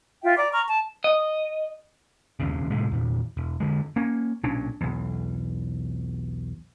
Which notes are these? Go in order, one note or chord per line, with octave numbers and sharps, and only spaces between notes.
F4 E5 G5
D5 A#5 D6
A#5 C#6 F6
A5
D#5
E1 D#2 C#3
A2 C3 G#3
E2 A#2
E1
D3 G#3
A#3 C#4
B1 A#2 C#4 D4
B1 E2